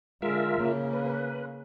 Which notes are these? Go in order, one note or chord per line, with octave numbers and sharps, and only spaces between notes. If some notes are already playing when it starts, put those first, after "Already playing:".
D3 G#3 F4 A#4 E5
C#3 A#3
B4